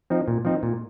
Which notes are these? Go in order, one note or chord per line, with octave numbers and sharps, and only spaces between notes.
F3 C4 D#4
A#2
F3 C4 D#4
A#2